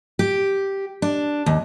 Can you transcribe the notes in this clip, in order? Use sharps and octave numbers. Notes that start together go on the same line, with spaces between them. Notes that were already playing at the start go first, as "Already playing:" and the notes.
G4
D4
D#2